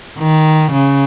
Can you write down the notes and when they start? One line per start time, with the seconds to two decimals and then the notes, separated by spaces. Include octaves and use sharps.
0.18 D#3
0.72 C#3